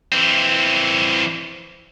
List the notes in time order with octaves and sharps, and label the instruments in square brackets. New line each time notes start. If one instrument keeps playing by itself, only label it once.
[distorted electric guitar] E3 C4